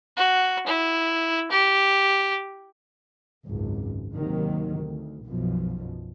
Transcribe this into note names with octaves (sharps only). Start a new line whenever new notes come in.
F#4
E4
G4
G#1 C#2 F#2
D#2 C3 D#3 F#3
D2
B1 F#2 B2 F3